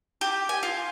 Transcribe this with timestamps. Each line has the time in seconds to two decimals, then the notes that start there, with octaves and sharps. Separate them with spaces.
0.21 G4
0.49 G#5
0.63 F4